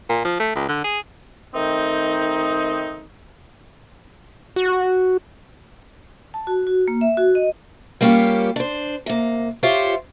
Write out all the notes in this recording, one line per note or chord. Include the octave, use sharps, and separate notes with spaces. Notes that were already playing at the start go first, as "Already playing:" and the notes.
A#2
F3
A3
C#2
D3
G#4
D#3 A3 C4 D#4
F#4
A5
F#4
F#4
A#3
E5
F#4
D#5
G3 A#3 C#4 F4 G4
D4 C5
C3 A#3
F4 G4 C5 C#5 E5